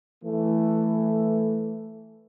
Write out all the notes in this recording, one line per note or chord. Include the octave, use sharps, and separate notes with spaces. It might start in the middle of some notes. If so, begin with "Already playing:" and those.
E3 A3